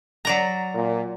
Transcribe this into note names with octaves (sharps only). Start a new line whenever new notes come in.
F#3 D5 A#5
A#2